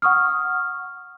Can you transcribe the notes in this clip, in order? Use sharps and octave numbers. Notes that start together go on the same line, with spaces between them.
F#5 C#6 D#6 F6